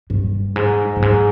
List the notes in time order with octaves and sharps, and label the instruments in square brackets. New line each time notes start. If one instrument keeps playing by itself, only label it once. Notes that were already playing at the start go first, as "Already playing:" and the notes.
[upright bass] G2
G#2
G2
G#2